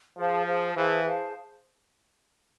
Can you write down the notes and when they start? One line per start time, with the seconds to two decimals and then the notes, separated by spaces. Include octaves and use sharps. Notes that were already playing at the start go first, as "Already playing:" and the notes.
0.17 F3 G#4 C5 F5 A5
0.46 G#4 C5 F5 A5
0.75 E3 G#4 C5 F5 A5
1.04 G#4 C5 F5 A5